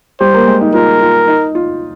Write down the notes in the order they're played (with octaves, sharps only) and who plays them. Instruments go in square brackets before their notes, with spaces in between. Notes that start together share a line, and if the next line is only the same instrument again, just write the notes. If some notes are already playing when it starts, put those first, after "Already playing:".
[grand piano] G3 G4 [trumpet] C5
[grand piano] A#3 A#4
G#3 G#4
D#4
[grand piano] F4 [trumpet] A#4
[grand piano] F4
D#4
F4